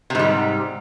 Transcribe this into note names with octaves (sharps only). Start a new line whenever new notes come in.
G#2 C3 G3